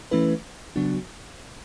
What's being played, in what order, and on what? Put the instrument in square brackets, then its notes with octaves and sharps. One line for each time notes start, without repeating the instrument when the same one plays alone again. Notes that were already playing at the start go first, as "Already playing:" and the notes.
[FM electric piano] E3 A3 C#4 E4 B4
C#3 F#3 B3 D4 F#4